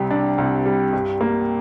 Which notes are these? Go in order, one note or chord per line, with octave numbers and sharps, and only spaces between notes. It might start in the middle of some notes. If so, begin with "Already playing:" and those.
Already playing: C2 C3 G3
D4
C2
G3
G2
A#3